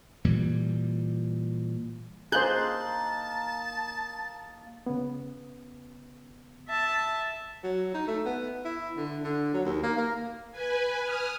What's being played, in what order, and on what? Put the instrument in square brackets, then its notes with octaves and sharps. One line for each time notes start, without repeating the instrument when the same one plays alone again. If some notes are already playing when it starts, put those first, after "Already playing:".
[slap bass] A#2 E3 G3
[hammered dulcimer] A#3 D#4 [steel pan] G#4 C5 [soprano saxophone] A5 [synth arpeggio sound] F#6 G6
[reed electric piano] C#3 B3
[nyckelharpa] E5 A5
[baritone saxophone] F#3
D#4
A3
B3
E4
D3
D3
F#3
D#2
A#3
A#3
[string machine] B4 G#5
D#6 F6